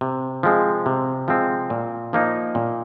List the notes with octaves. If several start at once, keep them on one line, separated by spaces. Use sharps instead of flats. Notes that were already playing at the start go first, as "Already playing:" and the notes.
C3
F3 G#3 C4
C3
F3 G#3 C4
A#2
F3 A#3 D#4
A#2